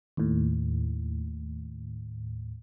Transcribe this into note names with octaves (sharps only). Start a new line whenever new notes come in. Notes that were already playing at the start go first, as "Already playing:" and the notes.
D#2 A2